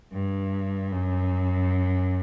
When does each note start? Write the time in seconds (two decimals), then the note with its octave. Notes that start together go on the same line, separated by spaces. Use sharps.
0.12 G2
0.92 F#2